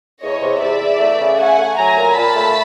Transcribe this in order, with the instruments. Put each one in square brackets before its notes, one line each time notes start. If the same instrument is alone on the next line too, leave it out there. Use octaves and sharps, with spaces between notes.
[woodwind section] E2 [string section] C#5 D#5
[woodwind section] C3
[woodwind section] E2 [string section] D5 E5
[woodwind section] E2
A3
C#3
[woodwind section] A3 [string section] F#5 G#5
[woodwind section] A3
[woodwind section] F#3 [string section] G#5 A#5
[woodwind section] A#2
[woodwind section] A#2 [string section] A5 B5
[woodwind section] A3